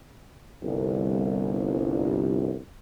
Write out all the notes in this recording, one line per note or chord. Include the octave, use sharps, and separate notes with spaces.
G1 C2